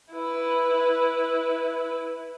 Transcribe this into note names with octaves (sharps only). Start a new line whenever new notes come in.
E4 B4